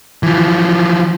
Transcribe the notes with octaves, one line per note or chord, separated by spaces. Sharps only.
E3 F3